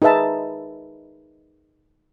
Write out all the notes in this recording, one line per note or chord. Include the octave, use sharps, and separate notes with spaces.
D#4 G#4 B4 E5 A5